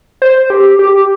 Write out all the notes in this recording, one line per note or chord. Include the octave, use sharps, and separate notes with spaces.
C5
G4
G4